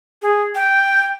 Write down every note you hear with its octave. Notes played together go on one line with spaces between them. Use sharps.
G#4
G5